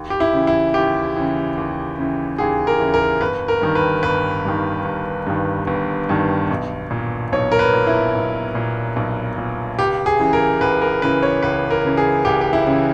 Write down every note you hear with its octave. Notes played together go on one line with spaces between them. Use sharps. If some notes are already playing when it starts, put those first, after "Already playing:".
Already playing: D#2
G4
E4
C#3 E3
E4
D#2 G4
C#3 E3
D#2
C#3 E3
D#2 G#4
A#4
C#3 E3
A#4
G1 B4
A#4
G2 D#3
B4
G1 B4
G2 D#3
G1
G2 D#3
G1
G2 D#3
B1
A#2
B1 C#5
A#4
B4
A#2
E4
B1
A#2
B1
A#2
C#2 G4
G#4
C#3 E3
A#4
C#2 B4
A#4
C#3 E3 B4
C#5
C#2 B4
A#4
C#3 E3
G#4
C#2 G4
G4
E4
C#3 E3